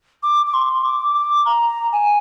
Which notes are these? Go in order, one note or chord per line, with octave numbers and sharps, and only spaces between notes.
D6
D6
C6
D6
D6
A#5
G#5